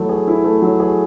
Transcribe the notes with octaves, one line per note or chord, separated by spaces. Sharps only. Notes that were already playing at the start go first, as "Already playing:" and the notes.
Already playing: F#3 A3 E4
G#4
E4
A3
F#3
G#4